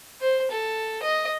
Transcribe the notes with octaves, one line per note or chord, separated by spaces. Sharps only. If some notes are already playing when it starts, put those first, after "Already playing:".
C5
A4
D#5